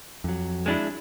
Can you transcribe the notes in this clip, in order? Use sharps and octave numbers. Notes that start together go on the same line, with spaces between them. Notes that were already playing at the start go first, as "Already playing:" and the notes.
F2 F#3
G#3 D4 E4